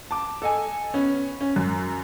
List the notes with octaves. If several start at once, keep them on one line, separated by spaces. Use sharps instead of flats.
A5 D6
A4 D#5 G#5
B3 C#4
C#4
F#2